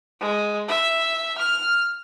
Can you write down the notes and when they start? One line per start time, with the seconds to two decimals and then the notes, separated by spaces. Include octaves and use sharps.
0.21 G#3
0.68 E5
1.38 F6